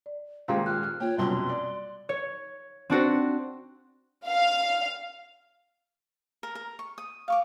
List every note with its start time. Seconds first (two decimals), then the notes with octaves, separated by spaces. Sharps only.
0.06 D5
0.48 D#1 A#2 G#3 F5 G5 A#5 C6
0.66 F6 F#6
1.00 A#3 F4 C#5 G5
1.18 F1 F#2 B2 G3 C6
1.49 D5
2.09 C#5
2.90 C4 D4 F#4 C5
4.27 F5
6.43 A#4
6.55 A#4
6.79 C#6
6.98 D#6
7.28 F5 C#6 D6